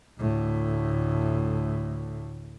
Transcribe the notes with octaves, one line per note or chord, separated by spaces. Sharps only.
D2 A2